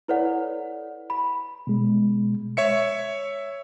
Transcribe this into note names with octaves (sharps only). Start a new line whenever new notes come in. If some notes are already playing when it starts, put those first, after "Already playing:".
E4 A4 B4 C#5 D5 F#5
B5
B2 G#3
C#5 E5 C#7